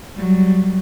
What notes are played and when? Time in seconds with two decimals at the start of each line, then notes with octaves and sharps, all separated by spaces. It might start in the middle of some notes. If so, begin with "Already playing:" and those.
0.15 F#3 G3